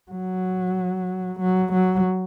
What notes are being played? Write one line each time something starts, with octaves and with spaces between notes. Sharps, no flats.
F#3
F#3
F#3